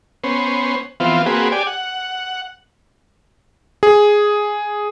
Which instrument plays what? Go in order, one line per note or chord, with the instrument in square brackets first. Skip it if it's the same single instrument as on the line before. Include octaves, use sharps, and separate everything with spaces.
[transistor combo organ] B3 C#4 C5
E3 F3 B3 C4 F4
A#3 C4 F#4 G#4 B4
G4 D5 G#5
F#5
[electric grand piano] G#4